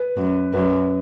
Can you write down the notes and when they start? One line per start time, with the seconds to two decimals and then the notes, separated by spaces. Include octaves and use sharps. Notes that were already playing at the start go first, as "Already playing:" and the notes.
Already playing: B4
0.17 F#2
0.53 F#2 B4